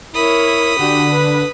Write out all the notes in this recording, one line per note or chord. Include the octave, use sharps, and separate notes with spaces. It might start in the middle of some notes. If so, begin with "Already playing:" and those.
E4 A#4 C#5 B5 D#6
D3 D4 F#4 G4
B4